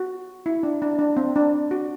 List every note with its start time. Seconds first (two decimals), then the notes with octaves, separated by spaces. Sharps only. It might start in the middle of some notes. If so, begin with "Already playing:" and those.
Already playing: F#4
0.46 E4
0.63 D4
0.82 D4
0.99 D4
1.17 C4
1.36 D4
1.71 F#4